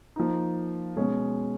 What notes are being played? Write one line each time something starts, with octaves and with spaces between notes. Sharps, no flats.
F3 A#3 D#4
B2 G#3 C#4